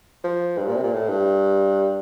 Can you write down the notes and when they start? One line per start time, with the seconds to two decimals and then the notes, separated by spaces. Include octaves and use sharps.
0.24 F3
0.58 G2
0.67 A#2
0.76 C3
0.84 A#2
0.93 A2
1.09 G2